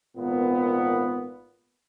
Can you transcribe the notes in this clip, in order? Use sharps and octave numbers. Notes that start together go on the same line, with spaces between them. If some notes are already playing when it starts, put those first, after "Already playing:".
G#1 A#2 B3